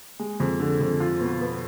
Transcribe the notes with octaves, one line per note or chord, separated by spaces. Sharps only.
G#3
F2
D3
F2
F4
B2
B3